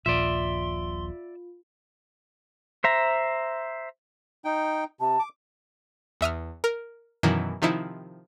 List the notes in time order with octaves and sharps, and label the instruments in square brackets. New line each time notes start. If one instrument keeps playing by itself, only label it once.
[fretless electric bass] D#1 A#1 [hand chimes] F4 [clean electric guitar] D5 E5 [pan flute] C6
[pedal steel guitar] C5 E5 A#5
[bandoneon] D#4 G5
[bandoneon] C3 [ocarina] A5
[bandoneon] D6
[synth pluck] E2 E5 D#6 F6
A#4
F#2 B2 D#3 E3 F#3
C3 D#3 F3 D#4 E4